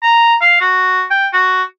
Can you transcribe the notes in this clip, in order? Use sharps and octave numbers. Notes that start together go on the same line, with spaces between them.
A#5
F5
F#4
G5
F#4